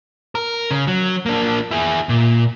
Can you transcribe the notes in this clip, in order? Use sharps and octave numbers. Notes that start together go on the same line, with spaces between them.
A#4
C#3
F#3
A#3 D4
E4 G#4
A#2